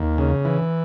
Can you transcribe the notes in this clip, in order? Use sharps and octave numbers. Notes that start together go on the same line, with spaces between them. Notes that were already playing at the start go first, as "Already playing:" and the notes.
Already playing: D#2
C#3
E3